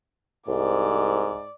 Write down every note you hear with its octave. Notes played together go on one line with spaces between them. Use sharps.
C2 G#2 D5